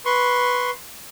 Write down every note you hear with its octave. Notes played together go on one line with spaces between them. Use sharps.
B4 C6 C#6